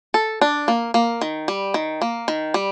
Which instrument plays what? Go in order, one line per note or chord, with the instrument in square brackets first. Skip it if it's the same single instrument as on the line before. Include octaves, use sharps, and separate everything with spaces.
[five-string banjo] A4
D4
A#3
A#3
D#3
G3
D#3
A#3
D#3
G3